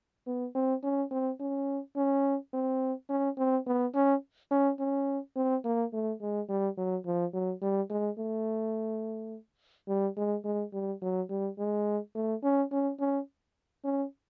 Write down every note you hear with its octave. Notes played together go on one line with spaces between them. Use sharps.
B3
C4
C#4
C4
C#4
C#4
C4
C#4
C4
B3
C#4
C#4
C#4
C4
A#3
A3
G#3
G3
F#3
F3
F#3
G3
G#3
A3
G3
G#3
G#3
G3
F#3
G3
G#3
A3
C#4
C#4
C#4
C#4